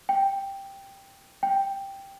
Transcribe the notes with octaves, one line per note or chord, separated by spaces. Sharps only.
G5
G5